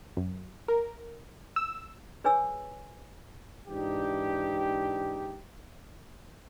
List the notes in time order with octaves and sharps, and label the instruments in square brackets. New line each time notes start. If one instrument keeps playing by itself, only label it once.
[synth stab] F#2
A#4
E6
[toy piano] G#4 B4 C#5 G#5 D6 E6
[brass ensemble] G#2 E3 D4 D#4 G4